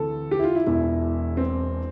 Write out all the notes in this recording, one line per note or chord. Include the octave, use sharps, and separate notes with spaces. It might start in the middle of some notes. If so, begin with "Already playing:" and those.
Already playing: D2 C3 E3 A4
G4
E4
F4
E4
E1 E2 B2 E4
C4